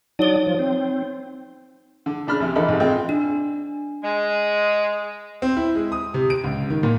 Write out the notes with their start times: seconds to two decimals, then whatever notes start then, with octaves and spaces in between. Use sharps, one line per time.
0.19 F#3 D#4 C#5 D5 D#6 G7
0.47 F3
0.59 C4
2.06 D3
2.27 C#3 D4 B5 F6
2.40 A#1 C3
2.56 E2 D3 D#4 A4 A#4 B5
2.68 G#2 C3
2.80 G#3 C4 F4
3.09 D4
4.04 G#3
5.42 C4
5.57 E4
5.75 G#3
5.92 D#6
6.14 C3
6.30 D7
6.44 C#2
6.70 D#3
6.83 A#2